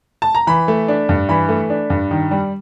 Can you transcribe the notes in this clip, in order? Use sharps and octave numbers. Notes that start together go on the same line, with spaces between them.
A5
A#5
E3 B5
A3
D4
G2
E3 B5
A3
D4
G2
D#3
G3